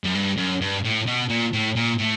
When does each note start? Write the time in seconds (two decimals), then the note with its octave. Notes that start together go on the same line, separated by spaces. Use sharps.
0.04 F#2
0.15 G2
0.38 F#2
0.62 G2
0.85 A2
1.07 B2
1.30 A#2
1.53 A2
1.76 A#2
1.98 A2